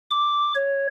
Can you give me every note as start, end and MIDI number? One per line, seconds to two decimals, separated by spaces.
0.11 0.53 86
0.55 0.87 73